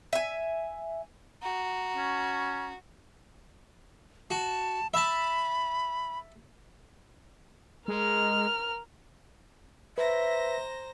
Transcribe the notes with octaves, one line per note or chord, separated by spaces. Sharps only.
E5 G#5
F#4 A#5
C#4
F#4 A5
E5 A5 B5
G#3 A#4 F6
B4 C5 E5 A#5 A#6